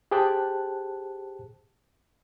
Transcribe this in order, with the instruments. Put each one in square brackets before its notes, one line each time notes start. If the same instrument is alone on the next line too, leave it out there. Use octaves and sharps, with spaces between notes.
[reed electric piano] G4 G#4 C5 G5 A5 F#6